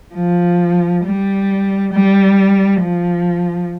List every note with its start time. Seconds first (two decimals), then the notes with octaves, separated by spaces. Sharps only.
0.15 F3
1.05 G3
1.93 G3
2.82 F3